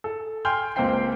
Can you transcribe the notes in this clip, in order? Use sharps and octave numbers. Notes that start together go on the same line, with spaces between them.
A4
G5 G#5 C6 F6 G6
C#2 A#3 C4 C5 G5 C7